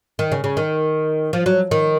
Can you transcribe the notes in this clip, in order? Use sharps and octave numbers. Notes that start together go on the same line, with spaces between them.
D#3
C#3
C#3
D#3
F3
F#3
D#3